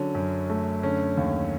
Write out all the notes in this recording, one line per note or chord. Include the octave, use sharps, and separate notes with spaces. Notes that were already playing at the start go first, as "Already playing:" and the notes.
Already playing: D3 F#3 C#4
F#2
A3
D3 C#4
D#2